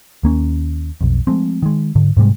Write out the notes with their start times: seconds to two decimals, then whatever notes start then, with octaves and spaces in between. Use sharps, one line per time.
0.23 D#2 A#3 C#4
1.01 B1 F2
1.27 F3 G#3 A3 C4
1.62 D#3 G#3
1.95 G#2 D3
2.17 G#2 C3 G3 G#3